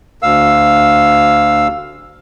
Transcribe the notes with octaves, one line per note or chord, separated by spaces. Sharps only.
D2 F5 E6